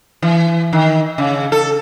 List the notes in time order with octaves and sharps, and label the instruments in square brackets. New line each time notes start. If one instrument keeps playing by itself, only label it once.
[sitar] E3
D#3
C#3
A4